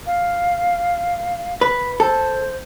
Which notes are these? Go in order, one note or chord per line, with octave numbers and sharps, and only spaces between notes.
F5
B4
A4 C5